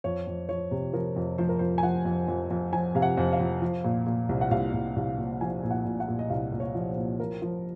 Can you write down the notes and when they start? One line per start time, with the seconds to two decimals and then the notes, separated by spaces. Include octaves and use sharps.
0.04 F2 C#5
0.27 F2
0.49 F3 C#5
0.71 C3
0.93 F3 A#4
1.16 F2
1.38 F3 C5
1.49 A#4
1.59 F2 C5
1.78 G#5
1.83 F3 F#5
2.05 F2
2.28 F2
2.51 F2
2.72 F3 G#5
2.95 C3 F5
3.02 F#5
3.17 F2
3.33 F5
3.40 F2
3.62 F3
3.84 A#2
4.06 A#2
4.29 C2
4.41 F#5
4.51 C2 F5
4.74 C2
4.96 C2
5.18 A#2
5.41 F3 G#5
5.63 A#2
5.71 F#5
5.85 A#2
6.00 F#5
6.08 A#2
6.19 D#5
6.30 C2 F5
6.52 A#2
6.60 C#5
6.75 F3
6.90 C5
6.97 A#2
7.20 F3 A#4
7.42 F3